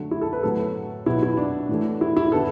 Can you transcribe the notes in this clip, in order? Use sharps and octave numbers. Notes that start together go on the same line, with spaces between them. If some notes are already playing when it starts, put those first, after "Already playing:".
Already playing: D3 F#3 A3
E4
A4
B4
A2 F#3 B3 A4
B2 F#3 B3 E4
E4
D4
A2 E3 A3
E4
E4
D3 B3 A4